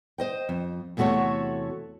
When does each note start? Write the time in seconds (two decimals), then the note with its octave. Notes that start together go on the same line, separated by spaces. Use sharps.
0.18 C5 D#5 G5
0.49 F2
0.97 E2 C3 A3 F#4 A4 C#5